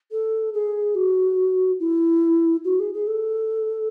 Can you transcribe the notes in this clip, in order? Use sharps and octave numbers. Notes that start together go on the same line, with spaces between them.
A4
G#4
F#4
E4
F#4
G#4
G#4
A4